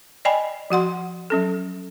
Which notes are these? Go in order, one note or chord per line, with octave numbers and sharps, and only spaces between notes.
D5 D#5 G5 G#5 B5
F3 F#4 F#5 C6
F#3 C#4 A4